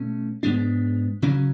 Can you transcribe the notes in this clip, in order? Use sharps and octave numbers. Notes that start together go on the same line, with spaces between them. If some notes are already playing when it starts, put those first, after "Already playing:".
Already playing: B2 A3 C#4
G#2 G#3 B3 D4
C#3 F#3 C#4